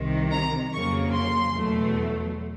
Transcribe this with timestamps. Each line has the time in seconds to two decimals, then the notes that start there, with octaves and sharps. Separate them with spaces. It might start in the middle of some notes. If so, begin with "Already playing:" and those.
Already playing: C2 C3 D#3
0.32 A#5
0.73 F2 C#3 F#3 A#3 C#6
1.14 C6
1.54 E2 B2 F#3 A3